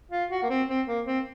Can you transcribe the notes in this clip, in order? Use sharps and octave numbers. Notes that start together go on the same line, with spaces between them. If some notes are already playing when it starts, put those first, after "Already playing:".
F4
F#4
A#3
C4
C4
A#3
C4